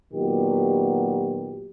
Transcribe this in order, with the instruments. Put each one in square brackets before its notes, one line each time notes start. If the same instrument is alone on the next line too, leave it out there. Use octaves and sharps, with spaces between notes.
[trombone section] A#2 D#3 F#3 B3 G4